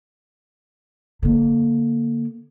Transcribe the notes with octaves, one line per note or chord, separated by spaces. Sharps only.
D3 A#3